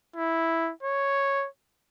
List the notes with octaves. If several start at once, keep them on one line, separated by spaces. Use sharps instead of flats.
E4
C#5